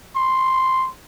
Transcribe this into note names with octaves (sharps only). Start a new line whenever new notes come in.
C6